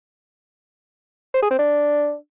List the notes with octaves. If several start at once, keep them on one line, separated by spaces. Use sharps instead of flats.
C5
G#4
C4
D4